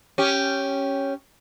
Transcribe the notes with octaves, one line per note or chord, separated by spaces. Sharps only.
C#4 G4